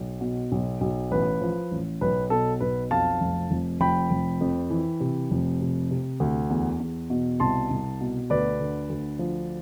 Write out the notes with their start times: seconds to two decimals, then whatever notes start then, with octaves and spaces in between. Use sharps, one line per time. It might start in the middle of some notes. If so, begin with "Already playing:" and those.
Already playing: B1
0.21 B2
0.52 B1
0.81 B1
1.11 A1 B4
1.41 F3
1.71 A1
2.01 B1 B4
2.30 B2 A4
2.61 B1 B4
2.91 F2 F5 A5
3.20 F1
3.51 F1
3.80 F1 G5 B5
4.11 F1
4.41 F2
4.70 E3
5.00 C3
5.31 F1
5.61 C3
5.91 C3
6.20 D2
6.50 E2
6.80 E2
7.10 B2
7.40 C2 A5 C6
7.71 C2
8.00 B2
8.30 D2 B4 D5
8.60 D3
8.90 D2
9.19 F3